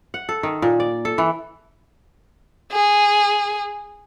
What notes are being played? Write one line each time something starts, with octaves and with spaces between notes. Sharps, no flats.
F#5
A4
D#3
A#2
D5
A4
E3
G#4